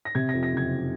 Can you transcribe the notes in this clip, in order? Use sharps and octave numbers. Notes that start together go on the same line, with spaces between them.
A#6
C3 G#6
A#6
F2
A#6
F#1 G#6